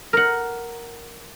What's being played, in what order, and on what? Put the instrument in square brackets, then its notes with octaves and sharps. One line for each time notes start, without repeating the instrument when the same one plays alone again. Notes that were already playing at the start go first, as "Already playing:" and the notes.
[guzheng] A#4 F#5